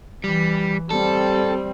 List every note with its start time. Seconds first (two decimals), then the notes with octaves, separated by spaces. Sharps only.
0.24 E3 G3
0.91 G3 C4 A4